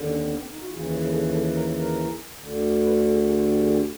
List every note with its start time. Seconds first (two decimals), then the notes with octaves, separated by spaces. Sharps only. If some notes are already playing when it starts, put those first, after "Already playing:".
Already playing: D#2 D3
0.09 C#4
0.23 C4
0.31 B3
0.37 C4
0.51 D#4
0.60 F#4
0.66 D#2 C#3 E3 F4
0.87 G#4
1.01 G#4
1.09 A4
1.31 A4
1.53 A#4
1.74 A#4
2.39 D2 D3
2.83 B4
2.96 A4
3.11 G#4
3.25 G#4
3.47 G4
3.62 G#4
3.69 G4